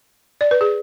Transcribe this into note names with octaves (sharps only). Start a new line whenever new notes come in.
D5
B4
G#4